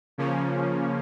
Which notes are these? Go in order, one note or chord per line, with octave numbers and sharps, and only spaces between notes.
C#3 F3 A#3 C#4